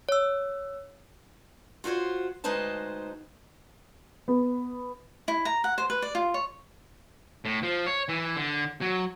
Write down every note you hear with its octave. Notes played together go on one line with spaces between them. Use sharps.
C#5 E6
F4 F#4 A4 C5 C#5
D2 G#3 D#4 B4 C5 A5
B3
E4
A#5
F#5
C5
B4
D5
F4
C#5
A2
F3
C#5
E3
D3
F#3